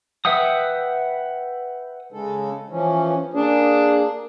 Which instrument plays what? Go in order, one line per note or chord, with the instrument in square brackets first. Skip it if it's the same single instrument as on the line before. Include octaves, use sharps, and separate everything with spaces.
[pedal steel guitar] B4 E5 F#5 G5 D#6
[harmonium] C#3 G#3 A4
E3 F3 C#4
[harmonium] A#3 G#4 [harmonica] D4